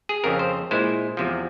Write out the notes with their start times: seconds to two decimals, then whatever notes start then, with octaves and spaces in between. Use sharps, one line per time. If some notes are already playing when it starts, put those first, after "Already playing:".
0.09 G#4
0.24 F2 C#3 F3 A#4
0.39 C5
0.71 A#2 G#3 E4 C5
1.17 E2 C3 F3